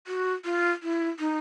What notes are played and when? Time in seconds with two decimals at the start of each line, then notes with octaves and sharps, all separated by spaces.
0.07 F#4
0.45 F4
0.83 E4
1.20 D#4